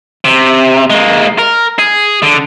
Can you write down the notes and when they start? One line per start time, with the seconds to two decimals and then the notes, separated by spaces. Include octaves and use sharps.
0.25 C3
0.90 G#3 A#3
1.39 A#4
1.79 G#4
2.22 D3